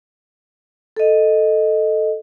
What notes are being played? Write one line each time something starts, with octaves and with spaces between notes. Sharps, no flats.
A4 D#5